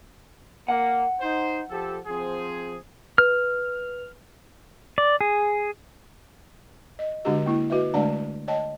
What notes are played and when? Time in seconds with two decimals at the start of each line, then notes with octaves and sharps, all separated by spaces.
0.68 A#3 F#5
1.21 D#4 C5
1.70 F3 G4 A4
2.07 F3 C4 G#4
3.18 B4 F6
4.98 D5
5.21 G#4
6.99 D#5
7.25 D3 G#3 D4 F#4 G4 D#5
7.46 A#3 E4
7.70 F#4 B4 D#5 E5
7.94 D3 G#3 A3 D4 D5 A5
8.48 C#5 D#5 G5 A5